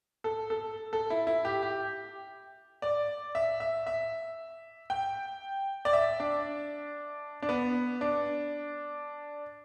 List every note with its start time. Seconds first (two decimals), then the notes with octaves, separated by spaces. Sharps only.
0.24 A4
0.50 A4
0.93 A4
1.10 E4
1.27 E4
1.45 G4
1.63 G4
2.82 D5
3.35 E5
3.60 E5
3.87 E5
4.90 G5
5.85 D5
5.93 E5
6.20 D4
7.42 D4
7.49 B3
8.01 D4